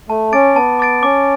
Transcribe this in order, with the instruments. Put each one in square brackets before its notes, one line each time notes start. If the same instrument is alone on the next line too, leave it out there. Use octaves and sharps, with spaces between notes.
[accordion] A3 [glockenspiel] A5
[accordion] C#4 [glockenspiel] D6 A6 D7
[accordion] B3 [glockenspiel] A5
[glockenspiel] D6 A6 D7
[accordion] C#4 [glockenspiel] D6